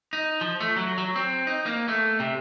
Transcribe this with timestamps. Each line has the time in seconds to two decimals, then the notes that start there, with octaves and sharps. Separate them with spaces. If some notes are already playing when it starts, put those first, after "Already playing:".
0.13 D#4
0.41 F3
0.60 A3
0.77 F#3
0.98 F#3
1.16 C4
1.47 D#4
1.66 A#3
1.88 A3
2.20 C3